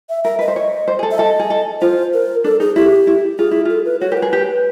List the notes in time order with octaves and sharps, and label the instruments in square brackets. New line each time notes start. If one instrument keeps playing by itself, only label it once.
[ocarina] E5
[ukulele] A#4 [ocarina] E5
[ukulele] B4 [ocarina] D#5
[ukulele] C5
C#5
C5
G#4
A4
[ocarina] E5
[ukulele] A4 [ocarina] D#5
[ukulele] G#4
A4
[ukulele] F4 [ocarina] C5
[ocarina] A#4
[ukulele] D4 [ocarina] A4
[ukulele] D#4 [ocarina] G#4
[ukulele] E4 [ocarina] G4
[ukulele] E4
[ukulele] F4 [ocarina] G#4
[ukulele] E4
[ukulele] F4 [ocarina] A4
[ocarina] B4
[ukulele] F#4 [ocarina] C#5
[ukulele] G4 [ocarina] A#4
[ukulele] G#4 [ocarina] B4
[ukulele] G4